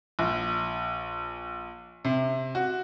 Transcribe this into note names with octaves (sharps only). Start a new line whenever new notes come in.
A#1
C3
F#4